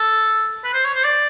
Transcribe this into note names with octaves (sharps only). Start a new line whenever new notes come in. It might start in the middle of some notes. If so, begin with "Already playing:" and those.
Already playing: A4
B4
C5
C#5
C5
D5